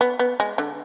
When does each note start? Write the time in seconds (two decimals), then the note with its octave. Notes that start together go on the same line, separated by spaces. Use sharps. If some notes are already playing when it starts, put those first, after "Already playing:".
0.01 B3
0.19 B3
0.40 G#3
0.58 D3